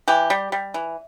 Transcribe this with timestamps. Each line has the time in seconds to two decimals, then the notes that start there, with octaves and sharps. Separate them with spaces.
0.08 E3 G4
0.30 G3
0.52 G3
0.74 E3